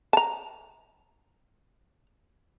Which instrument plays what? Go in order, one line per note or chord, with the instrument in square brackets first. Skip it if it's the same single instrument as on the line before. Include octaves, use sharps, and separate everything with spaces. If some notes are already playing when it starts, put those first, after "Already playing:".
[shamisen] A5 A#5